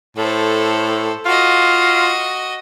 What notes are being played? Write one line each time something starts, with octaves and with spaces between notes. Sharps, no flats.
A2 A4 C5
F4 F#4 D#5